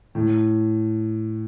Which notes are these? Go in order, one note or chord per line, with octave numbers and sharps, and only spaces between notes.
A2